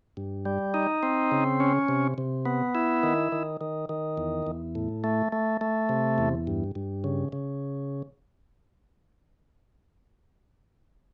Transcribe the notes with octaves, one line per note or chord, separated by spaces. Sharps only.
G2
G3
D#4
C4
C#3
C#4
C3
C3
B3
E4
D#3
D#3
D#3
D#3
E2
E2
A2
A3
A3
A3
C3
E2
G2
G2
C#3
C#3